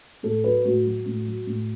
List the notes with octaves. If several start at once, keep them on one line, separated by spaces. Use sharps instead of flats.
A2 A4
F#3 B4
A2 F#4
F#3
A2
F#3
A2